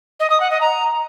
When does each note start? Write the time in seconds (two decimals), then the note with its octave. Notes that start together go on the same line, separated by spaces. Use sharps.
0.20 D#5
0.30 D#6
0.40 F#5
0.51 D#5
0.61 A#5